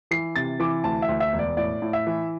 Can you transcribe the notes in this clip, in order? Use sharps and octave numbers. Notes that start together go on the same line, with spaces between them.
E3 C7
C3 A6
E3 D6
D2 A5
E5
D2
E5
E1
D5
A2 D5
A2
E5
E3